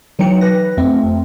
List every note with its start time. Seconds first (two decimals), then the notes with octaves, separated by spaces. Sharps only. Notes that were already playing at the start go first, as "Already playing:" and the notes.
0.19 D3 E3 F#3 D#4 G5 C#7
0.41 B4 A#6
0.77 F2 A3 C4